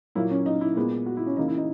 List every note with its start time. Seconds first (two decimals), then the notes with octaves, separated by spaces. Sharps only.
0.15 A#2 F#3 A#3 E4
0.31 C#4
0.46 D#4
0.61 E4
0.76 A#2 G#3 B3
1.06 F#4
1.17 E4
1.26 C#4
1.37 C#3 E3 A#3 D#4
1.48 E4
1.58 D#4